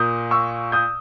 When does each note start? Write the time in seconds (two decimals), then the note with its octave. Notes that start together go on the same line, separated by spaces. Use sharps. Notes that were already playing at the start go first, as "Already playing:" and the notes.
Already playing: A#2 A#3 D#6 G6
0.31 C#6 E6
0.72 D#6 G6